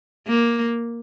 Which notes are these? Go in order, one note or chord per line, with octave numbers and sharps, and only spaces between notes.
A#3